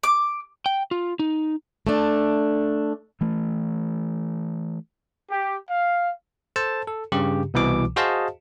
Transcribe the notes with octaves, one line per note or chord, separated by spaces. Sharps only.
D6
G5
F4
D#4
A3 D4
E3 A3
G4
F5
A4 C5 A5
A4
G2 C#3 G4
C2 B2 E3 D6
F#4 G#4 C5 D#5 F5 A5